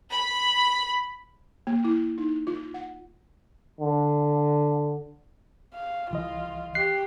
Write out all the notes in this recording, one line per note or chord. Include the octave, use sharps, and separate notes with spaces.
B5
A#3
E4
D#4
F4
F#5
D3
F5
C2 E3 F4 D#5
G4 F#6 C7